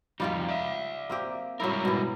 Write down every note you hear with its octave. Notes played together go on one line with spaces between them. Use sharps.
F2 G3 D#4 F4 G4
D5 E5
A#3 C4 G4
G#2 F#3 G3 E4 A#4
B2 E3